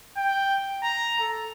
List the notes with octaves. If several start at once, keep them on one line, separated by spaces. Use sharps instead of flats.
G5
A#5
A4